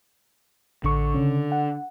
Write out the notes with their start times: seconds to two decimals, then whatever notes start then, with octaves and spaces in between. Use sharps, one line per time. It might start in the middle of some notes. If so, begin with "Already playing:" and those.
0.84 A1 D3 C#6
1.14 C#3 C#4
1.52 F#5